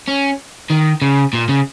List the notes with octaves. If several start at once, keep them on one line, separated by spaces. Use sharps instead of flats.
C#4
D#3
C#3
A#2
C#3